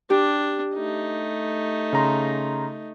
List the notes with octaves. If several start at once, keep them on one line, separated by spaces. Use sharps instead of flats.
D4 G4
A3 D#4
C#3 A#5 C6